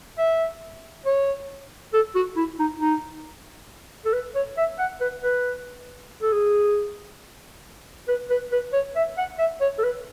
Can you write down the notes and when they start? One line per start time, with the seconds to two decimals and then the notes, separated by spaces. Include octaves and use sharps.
0.18 E5
1.06 C#5
1.94 A4
2.15 F#4
2.37 E4
2.59 D#4
2.81 D#4
4.05 A4
4.13 B4
4.35 C#5
4.57 E5
4.79 F#5
5.01 B4
5.22 B4
6.22 A4
6.32 G#4
8.08 B4
8.30 B4
8.52 B4
8.73 C#5
8.95 E5
9.18 F#5
9.39 E5
9.61 C#5
9.78 A4
9.83 B4